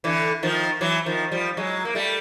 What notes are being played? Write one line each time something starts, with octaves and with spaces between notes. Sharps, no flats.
D3 E3
D#3 F3
E3 F#3
D#3 F3
F3 G3
F#3 G#3
A#3
G3 A3